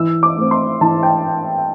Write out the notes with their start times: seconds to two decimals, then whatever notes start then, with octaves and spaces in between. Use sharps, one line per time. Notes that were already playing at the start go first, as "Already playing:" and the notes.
Already playing: E3 E6
0.23 D6
0.37 A3 C4
0.51 C6
0.81 E3 A5
1.03 G5